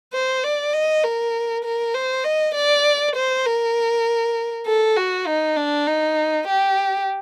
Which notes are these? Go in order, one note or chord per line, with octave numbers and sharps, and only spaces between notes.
C5
D5
D#5
A#4
A#4
C5
D#5
D5
C5
A#4
A4
F#4
D#4
D4
D#4
G4